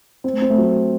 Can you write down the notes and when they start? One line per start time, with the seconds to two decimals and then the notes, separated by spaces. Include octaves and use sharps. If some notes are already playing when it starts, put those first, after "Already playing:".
0.24 C4
0.33 A3
0.42 C4
0.50 A3
0.58 F#3